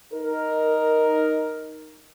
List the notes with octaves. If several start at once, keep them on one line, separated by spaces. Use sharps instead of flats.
D#4 A#4